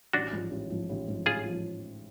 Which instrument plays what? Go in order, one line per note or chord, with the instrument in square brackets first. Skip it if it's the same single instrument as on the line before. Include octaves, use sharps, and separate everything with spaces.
[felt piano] A1 [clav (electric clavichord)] D4 F#4
[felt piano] G#2 F3
A1
G#2 F3
A1
G#2 F3
[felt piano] A1 [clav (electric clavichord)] F4 G#4
[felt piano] F3